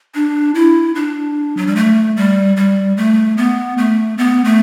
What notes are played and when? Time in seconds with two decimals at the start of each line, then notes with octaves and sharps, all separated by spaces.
0.15 D4
0.55 E4
0.95 D4
1.57 F#3
1.67 G3
1.76 A3
2.17 G3
2.57 G3
2.97 A3
3.37 B3
3.78 A3
4.18 B3
4.45 A3